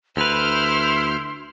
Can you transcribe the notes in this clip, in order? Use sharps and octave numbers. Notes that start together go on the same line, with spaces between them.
D2 E4 B4 C6 F6 G6